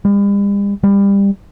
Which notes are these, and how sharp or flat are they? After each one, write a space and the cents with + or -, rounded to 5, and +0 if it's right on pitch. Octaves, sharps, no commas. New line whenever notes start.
G3 +45
G3 +25